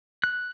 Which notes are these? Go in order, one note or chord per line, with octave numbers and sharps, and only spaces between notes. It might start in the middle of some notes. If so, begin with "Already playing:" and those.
F#6